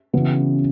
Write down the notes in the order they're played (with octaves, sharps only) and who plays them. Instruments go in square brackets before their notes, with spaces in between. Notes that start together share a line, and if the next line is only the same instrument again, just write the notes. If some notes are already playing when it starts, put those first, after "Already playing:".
[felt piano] C#3 E3 B3 F#4